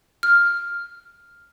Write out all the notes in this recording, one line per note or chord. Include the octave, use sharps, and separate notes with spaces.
F6